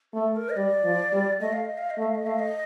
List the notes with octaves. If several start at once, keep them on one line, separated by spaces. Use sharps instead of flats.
A3 A4
A#4
D#5
G3 D5
F3
G3
A3 D#5
F5
D#5
F5
D#5
A3
F5
D#5
A3 F5
D#5